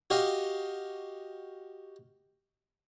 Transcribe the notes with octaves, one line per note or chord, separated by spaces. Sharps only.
F#4 G4 D#5 F5